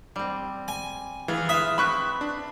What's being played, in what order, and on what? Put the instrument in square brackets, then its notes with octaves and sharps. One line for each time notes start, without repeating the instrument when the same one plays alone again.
[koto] G3 C4
[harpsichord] G#5
[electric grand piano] E3 [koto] F4 G#4 B4
[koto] B4 F5 [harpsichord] E5 [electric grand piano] D#6
[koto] C4 E4 B4 [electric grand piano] B5 C#6 F#6
[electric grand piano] D4